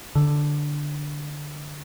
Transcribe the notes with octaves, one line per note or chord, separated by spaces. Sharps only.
D3